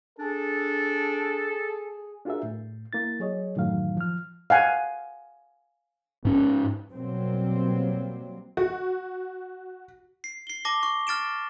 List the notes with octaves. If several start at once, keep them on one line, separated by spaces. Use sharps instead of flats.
D4 G#4 A4
D4 F4 F#4 G#4 A#4 E5
A2
A#3 E4 A6
F#3 G#4 C#5 D#5
F#2 A2 D#3 E3 F#3 F5
F3 F6
F5 F#5 G#5
G#2 C#4
B2 F#3 G3 A#3 C4
F#4
C7
C7 G7
A5 D6 A#6 G7
C#6
F6 A6 D7 E7